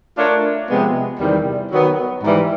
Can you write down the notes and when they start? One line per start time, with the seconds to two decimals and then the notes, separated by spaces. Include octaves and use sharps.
0.18 A3 D4 F4 A#4 C#5
0.69 C3 F3 G#3 B3
1.20 E2 C3 D#3 G3
1.72 D#3 F#3 B3
2.22 G#2 E3 G3